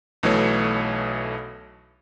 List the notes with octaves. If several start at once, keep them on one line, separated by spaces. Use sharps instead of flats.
B1 B2 E3 A3 C#5